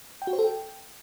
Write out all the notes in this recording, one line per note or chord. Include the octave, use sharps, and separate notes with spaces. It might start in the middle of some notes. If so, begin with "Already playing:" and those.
G5
F#4
C5
A4
G5